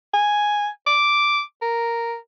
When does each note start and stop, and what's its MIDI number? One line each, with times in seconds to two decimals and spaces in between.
0.14 0.68 80
0.86 1.41 86
1.62 2.16 70